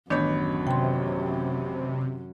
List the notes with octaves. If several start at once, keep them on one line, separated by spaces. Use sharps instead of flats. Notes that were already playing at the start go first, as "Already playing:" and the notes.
A1 F#2 D#3 B3 D4 C#5 G6
C3 G5 C6